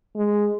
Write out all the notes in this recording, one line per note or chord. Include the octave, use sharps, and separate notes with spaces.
G#3